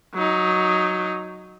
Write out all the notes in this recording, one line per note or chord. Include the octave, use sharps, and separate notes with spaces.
F#3 D#4